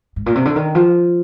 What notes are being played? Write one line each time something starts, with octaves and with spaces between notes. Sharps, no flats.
G#2
A#2
C3
D3
D#3
F3